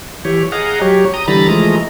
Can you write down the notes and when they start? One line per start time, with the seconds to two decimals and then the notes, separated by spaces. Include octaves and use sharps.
0.25 E3 G4 C#5
0.52 G#4 D#5 F5 F#5 A#5
0.81 F#3 G4 C#5
1.14 A#5 D#6
1.28 D3 E3 G3 A#5 B5 A6
1.49 E3 F3 G#3 A3 D#5 A#5